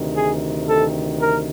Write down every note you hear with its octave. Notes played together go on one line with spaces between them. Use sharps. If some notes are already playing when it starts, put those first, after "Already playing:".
Already playing: D2 C3 D#3
G#4
A4
A#4